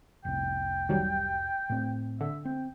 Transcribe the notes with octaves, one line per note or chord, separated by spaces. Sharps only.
F1 C2 G5
D#3 F#3 G3
A2 C4
D3 E5
C4 G5